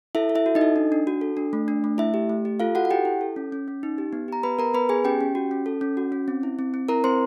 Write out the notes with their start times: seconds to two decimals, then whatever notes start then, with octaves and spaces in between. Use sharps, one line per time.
0.15 E4 A4 E5
0.29 A4
0.35 E4 E5
0.46 F#4
0.55 D#4 D#5
0.61 A4
0.76 D4
0.92 D4
1.07 F#4
1.21 A4
1.37 D4
1.53 A3
1.68 D4
1.84 A3
1.98 A3 E4 E5
2.14 G4
2.30 A3
2.45 G4
2.60 F4 A4 F5
2.75 F#4 A4 F#5
2.85 F#5
2.91 E4 G4 G5
3.05 E4
3.21 A4
3.36 C#4
3.52 C#4
3.68 C#4
3.83 D#4
3.98 G4
4.13 B3
4.28 G4 A#5
4.43 B3 B4 B5
4.58 B3 A#4 A#5
4.74 B3 B4 B5
4.89 B3 G#4 G#5
5.04 C#4 G4 G5
5.21 C#4
5.35 F#4
5.51 C#4
5.66 A4
5.81 C#4
5.97 F#4
6.12 C#4
6.28 C4
6.43 E4
6.59 C4
6.74 C4
6.88 E4 A#4 A#5
7.04 C4 C5 C6